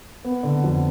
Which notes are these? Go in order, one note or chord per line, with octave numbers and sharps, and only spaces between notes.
B3
D3
F2